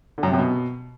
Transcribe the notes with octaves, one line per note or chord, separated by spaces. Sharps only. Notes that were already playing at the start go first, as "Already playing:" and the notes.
D3
F#2
C3
F#2
B2